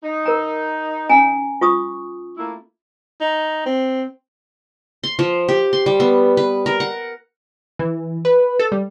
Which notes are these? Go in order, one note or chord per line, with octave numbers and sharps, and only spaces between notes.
D#4
A#4 A#5
C#4 G#5 A#5
F4 C#6 D#6
A3 A#3 E4
D#4
C4
C6
F3
G4
C6
G3
B3
B4
A#4
F#5
E3
B4
A4
G3